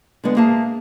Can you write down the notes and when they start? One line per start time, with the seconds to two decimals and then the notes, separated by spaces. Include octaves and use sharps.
0.24 D3 G3 G#3 B3
0.37 A#3 G#4 E5 A5